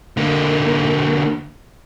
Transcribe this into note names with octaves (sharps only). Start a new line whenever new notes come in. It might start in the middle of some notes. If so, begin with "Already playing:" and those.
D3 A#3